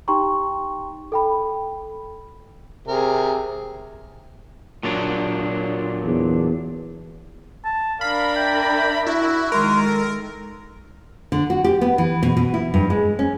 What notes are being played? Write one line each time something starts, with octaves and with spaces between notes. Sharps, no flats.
D#4 G4 G5 A#5 C6 C#6
A4 G5 B5
C3 G#4 A#4
A#2 F#3 D4
E2
A5
D4 A#4 F5 B5
E5 G5
E4 F#4
D#3 G#3 A#4 C6
A4
D3
F#4
G4
B3
E3
B2
B2
E4
G2
G#3
C#4